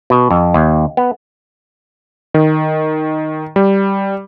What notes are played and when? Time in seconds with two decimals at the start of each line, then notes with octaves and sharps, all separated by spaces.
0.10 B2
0.31 F2
0.54 D#2
0.97 B3
2.34 D#3
3.56 G3